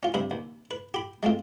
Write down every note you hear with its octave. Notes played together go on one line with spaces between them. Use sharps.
C#4 F4
G2 C3 E5 B5
D#2
B4
G4 B5
G#3 A3 C4 F4